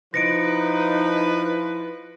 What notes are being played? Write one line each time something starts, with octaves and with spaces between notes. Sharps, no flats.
F3 D#4 E4 B4 A#6 C#7 D7